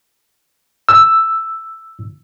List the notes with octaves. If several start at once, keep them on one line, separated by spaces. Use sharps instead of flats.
E6